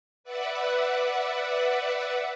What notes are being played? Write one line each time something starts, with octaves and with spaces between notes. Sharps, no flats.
B4 D5 E5 F#5